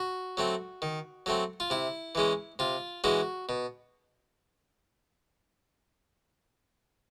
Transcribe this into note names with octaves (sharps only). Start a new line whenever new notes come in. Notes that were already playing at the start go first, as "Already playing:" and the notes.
Already playing: F#4
F#3 A3 C4
D#3
F#3 A3 C4
F4
C3 E4
E3 G#3 C#4
C3 F4
E3 G#3 C#4 F#4
B2